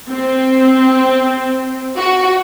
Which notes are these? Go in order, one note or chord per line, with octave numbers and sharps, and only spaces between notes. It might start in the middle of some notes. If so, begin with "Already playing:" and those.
C4
F#4